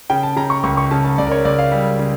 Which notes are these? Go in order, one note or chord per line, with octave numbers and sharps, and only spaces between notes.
C#3 G5
A5
C#3 A#5
C#6
C#2 C#6
C#6
C#3 A5
A5
C#2 D5
A#4
C#5
C#2 D5
F5
G3
C#3